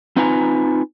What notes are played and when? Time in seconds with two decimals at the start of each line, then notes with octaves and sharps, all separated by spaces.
0.17 C4 D#4 F4 B4 G#5 A#5